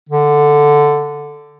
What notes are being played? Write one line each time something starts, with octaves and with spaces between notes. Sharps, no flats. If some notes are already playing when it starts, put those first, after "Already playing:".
D3